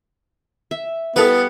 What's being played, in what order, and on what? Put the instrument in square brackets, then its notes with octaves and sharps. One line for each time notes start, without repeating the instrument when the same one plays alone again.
[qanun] E5
[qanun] G3 F5 [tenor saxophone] B3 [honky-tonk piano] E4 A4 D#6 [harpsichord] B4